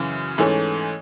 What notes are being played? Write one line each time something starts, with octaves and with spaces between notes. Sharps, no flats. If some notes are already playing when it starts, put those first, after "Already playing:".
Already playing: F#2 C#3 E3
G#2 E3 A3 C#4